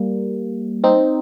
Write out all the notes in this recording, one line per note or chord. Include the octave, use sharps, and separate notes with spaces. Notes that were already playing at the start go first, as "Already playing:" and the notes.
Already playing: G3 A#3
C4 D#4